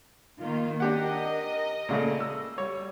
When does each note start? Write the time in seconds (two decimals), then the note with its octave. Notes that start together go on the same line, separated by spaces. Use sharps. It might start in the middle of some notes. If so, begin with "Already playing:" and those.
0.41 D#3 A#3 F4
0.80 D4 G4 A#4 D#5 F#5
1.89 A#2 C#3 A3
2.20 E6
2.58 G3 C#5